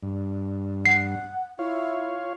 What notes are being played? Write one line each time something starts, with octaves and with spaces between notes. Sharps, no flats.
G2
F#5 C7
E4 F4 C#5 F5